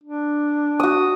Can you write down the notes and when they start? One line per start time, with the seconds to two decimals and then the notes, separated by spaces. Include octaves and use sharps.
0.04 D4
0.80 F#4 D#6